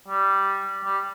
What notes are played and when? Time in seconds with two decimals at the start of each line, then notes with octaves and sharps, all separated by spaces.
0.08 G3
0.85 G3